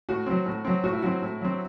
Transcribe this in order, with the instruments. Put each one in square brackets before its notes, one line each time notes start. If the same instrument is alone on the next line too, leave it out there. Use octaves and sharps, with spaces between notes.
[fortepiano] A2 [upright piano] F#4
[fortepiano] F#3 C4
A2
F#3 C4
[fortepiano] A2 [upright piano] F#4
[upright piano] E4
[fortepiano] F#3 C4 [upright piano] F#4
[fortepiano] A2
F#3 C4